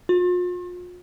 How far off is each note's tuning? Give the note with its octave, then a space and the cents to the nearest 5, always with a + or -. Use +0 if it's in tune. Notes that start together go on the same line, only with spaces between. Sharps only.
F4 +40